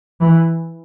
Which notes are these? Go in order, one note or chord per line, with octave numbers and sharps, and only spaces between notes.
E3